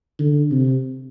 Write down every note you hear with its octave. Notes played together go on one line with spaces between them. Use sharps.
D3
C3